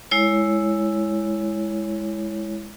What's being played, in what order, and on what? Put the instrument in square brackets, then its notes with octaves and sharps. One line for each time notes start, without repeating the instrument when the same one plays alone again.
[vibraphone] G#3 E4 C#5